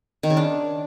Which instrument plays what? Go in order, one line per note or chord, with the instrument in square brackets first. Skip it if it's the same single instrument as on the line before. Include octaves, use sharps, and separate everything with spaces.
[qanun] D#3
C#3
D4